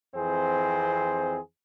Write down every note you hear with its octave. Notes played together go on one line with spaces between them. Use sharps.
F2 E3 C4 G#4 C5